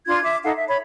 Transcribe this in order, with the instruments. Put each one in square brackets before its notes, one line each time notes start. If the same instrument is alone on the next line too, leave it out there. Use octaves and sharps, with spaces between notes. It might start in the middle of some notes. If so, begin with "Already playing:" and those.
[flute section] D4 F4 C6 G#6
E5 D6
D#4 A4 F5 F#5
E5
C#5 B5